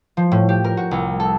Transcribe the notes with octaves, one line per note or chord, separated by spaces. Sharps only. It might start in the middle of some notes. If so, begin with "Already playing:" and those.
F3
A2
G4
A#4
F#4
C2
A4